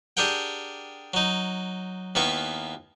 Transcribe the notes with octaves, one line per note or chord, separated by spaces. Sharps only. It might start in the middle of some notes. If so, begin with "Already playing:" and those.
D4 G4 G#4 A#4 F#5 G5
F#3 D#4
D#2 A#3 B3 E4 C#6